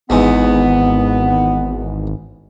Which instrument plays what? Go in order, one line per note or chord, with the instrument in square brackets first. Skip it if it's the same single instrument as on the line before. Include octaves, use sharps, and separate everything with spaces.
[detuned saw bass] G#1 [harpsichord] E2 G#2 [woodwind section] B3